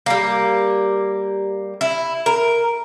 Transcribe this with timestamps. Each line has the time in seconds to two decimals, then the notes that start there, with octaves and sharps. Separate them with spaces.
0.06 G3 A#3
1.81 E4
2.26 A#4